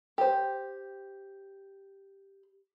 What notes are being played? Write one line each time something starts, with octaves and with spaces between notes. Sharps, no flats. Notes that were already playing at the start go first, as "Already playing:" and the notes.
G4 C5